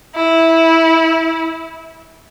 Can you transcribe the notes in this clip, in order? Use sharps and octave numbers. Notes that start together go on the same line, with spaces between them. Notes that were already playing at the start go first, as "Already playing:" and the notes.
E4